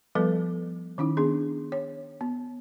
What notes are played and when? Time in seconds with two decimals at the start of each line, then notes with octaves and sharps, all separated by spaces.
0.15 F3 G3 B3 A4 B4
0.98 D#3 C#4 D#4 E4
1.17 B3 D4 G#4
1.72 C#5
2.21 B3